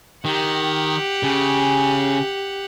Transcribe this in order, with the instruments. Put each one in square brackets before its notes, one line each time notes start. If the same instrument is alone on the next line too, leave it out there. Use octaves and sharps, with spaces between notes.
[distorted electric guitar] D#3 [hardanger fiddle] G4 F#5
[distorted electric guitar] C#3